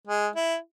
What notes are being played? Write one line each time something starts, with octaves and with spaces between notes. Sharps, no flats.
G#3
E4